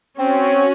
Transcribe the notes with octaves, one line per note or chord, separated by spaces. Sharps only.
C4 C#4 F#4 C#5